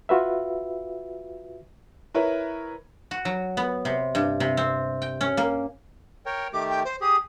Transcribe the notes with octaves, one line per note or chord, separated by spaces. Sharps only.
F4 F#4 B4 E5
E4 A#4 B4 C#5
F#4
F#3
B3
C3
G2
C3
C4
G5
C#4
A#3
A#4 C#5 G5
D#3 A3 G4 D6
G5
C5
G4 G#4 D#6